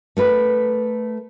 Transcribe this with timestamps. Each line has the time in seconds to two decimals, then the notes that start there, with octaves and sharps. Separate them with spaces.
0.17 A3 A#4 B4